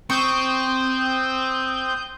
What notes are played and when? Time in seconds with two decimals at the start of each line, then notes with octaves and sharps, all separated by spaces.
0.10 C4 C#6 D#6 G6